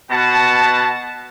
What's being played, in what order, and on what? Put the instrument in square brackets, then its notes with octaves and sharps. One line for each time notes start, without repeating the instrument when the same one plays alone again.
[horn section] B2 F#5 A5